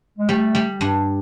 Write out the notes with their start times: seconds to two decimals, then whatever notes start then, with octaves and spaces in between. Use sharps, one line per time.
0.17 G#3
0.29 G3 A3
0.55 G3
0.81 G2